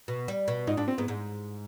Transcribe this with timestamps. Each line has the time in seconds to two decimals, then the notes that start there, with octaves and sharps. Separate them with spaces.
0.08 B2
0.28 G3
0.48 B2
0.67 G#2 D#4
0.77 G#2 D4
0.88 C4
0.98 G#2 B3
1.08 G#2